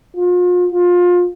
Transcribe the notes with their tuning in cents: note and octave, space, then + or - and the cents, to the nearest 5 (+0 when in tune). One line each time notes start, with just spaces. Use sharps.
F4 +40
F4 +25